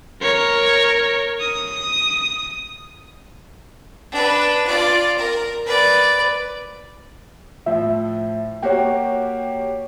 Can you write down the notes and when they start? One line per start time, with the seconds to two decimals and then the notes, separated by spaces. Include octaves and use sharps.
0.22 A#4 C#5
1.40 D#6
4.12 D4 B4
4.66 F4 D5
5.18 A#4
5.66 B4 D5
7.66 A2 F3 E5
8.62 A#3 F#4 G4 C#5 G5